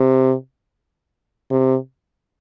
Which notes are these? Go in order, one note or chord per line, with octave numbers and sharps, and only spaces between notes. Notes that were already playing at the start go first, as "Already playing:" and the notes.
Already playing: C3
C3